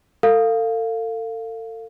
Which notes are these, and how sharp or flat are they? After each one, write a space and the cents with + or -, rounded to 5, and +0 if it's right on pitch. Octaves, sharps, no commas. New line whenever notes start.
A4 +35 F5 +0